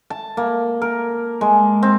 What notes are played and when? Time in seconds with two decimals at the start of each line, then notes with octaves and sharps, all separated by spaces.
0.10 A5
0.37 A#3
0.82 A#4
1.41 G#3
1.83 C4